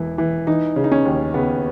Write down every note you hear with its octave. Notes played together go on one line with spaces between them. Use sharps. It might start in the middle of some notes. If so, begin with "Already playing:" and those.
Already playing: E1 E3 E4
E3
E3 D#4
C#3
D#4
C#4
D#2
C#3 B3